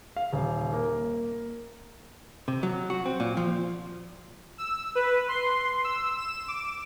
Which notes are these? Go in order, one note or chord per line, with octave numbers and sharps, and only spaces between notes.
F5
D#1
A#3
C3
F#3
F#4
C4
A#2
F3
E6
B4
C6
E6
E7
D6